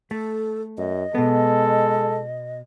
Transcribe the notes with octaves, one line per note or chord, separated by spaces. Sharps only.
A3 A4
F#2 D#5
B2 G#3 B3 A4